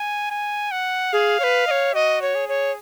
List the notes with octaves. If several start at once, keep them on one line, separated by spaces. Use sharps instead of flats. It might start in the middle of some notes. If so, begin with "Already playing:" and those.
Already playing: G#5
G#5
F#5
G#4 F5
C#5
B4
D#5
C#5
F#4 D#5
C#5
G#4
C#5